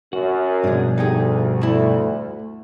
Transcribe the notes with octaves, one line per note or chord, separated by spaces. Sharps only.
F#2 F#4
G2 B2 F3 D4 G#4
D2 D#4 G4 G#4
A3 E4